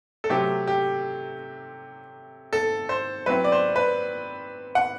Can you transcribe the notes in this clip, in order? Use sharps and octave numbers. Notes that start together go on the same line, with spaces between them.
A4
C3 F#3 A3 C4 G4
G4
A4
C5
F#3 C4 E4 B4
D5
C5
B4
F#5